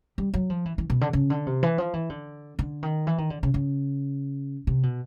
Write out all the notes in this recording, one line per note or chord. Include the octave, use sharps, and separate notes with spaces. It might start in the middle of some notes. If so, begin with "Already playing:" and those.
G3
F#3
F3
E3
E3
B2
D3
C#3
D3
C3
E3
F3
E3
D3
D3
D#3
E3
D#3
D3
C#3
C#3
C3
B2